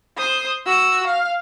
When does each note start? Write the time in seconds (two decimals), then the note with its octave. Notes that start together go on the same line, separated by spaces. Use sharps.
0.17 C5 D#6
0.66 F#4 E6
1.06 F5